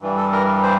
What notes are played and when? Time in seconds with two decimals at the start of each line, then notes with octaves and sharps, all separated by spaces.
0.01 G2 E3 G3
0.17 A4
0.32 A#4
0.63 C5